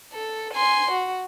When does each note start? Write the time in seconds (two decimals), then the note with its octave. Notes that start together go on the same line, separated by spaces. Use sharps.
0.13 A4
0.54 G#5 C6
0.91 F#4